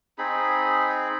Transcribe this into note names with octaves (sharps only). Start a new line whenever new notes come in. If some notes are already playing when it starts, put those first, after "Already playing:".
C4 D#4 G#4 B5